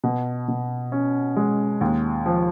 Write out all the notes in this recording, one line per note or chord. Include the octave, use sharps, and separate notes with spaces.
B2
B2
C#4
G#3
D#2
F3